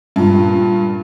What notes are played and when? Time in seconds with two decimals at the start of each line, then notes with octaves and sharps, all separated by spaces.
0.16 G2 A#2